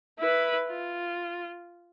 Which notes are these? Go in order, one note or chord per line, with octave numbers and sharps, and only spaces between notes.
E4 B4
F4